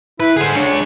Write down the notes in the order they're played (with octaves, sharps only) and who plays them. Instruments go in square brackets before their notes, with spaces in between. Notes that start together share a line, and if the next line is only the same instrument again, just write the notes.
[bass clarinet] E4 [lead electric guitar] B4
[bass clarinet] D3 [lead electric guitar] G#4 C5
[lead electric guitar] G#3 C#5 [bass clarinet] D4